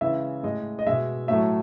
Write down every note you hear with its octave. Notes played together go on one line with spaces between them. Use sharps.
C#3 E3 G#3 E5
A2 G#3 D#5
D#5
B2 G#3 E5
A2 F#3 A3 E5